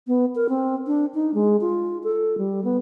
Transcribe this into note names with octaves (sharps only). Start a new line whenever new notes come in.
B3
A#4
C4
D4
D#4
G#3
F4
A4
G3
B3